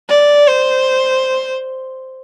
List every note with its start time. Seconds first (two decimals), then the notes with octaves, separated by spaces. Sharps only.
0.09 D5
0.47 C5